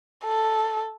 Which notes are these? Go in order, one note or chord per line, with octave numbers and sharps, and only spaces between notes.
A4